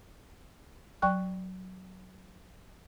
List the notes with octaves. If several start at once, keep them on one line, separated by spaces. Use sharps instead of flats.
F#3 D5 G5 C#6 F#6